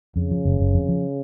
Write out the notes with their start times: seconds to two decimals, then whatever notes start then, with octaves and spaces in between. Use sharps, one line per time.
0.16 F2 C#3
0.31 F3
0.45 F#1
0.60 F#1
0.74 F2
0.89 F3